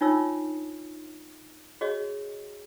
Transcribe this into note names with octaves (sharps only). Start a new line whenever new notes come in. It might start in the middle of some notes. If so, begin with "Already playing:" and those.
D4 D#4 F4 C#5 E6
F#4 G#4 C#5 D#5